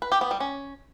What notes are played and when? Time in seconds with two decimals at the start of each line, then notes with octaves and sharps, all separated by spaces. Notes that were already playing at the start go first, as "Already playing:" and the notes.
0.02 B4
0.12 G4
0.21 B3
0.31 G3
0.40 C#4